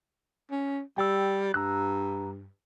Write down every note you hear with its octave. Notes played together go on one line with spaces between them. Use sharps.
C#4
G3 G5 E6
G2 A#5 E6 F#6